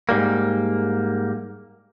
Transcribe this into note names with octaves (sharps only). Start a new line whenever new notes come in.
G#2 G3 A#3